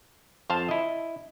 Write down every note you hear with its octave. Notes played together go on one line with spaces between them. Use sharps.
F2 C5 F5 A5
E4 D#5